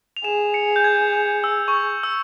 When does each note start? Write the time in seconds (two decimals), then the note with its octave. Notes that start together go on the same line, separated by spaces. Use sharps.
0.17 F7
0.24 G#4 E7
0.54 C#7
0.76 G6
0.84 G#6
1.13 G6
1.44 E6
1.68 C#6
1.74 E6
2.03 E6